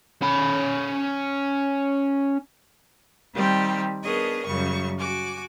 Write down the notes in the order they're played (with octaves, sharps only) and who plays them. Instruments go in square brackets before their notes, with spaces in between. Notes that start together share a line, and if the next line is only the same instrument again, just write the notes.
[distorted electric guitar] C#4 B5
[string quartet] D#3 G3 C4 F4 G4
B3 D4 G#4 A#4 C#5 D#5
F#2 C#3 G3 C#6
F#4 G#5 D6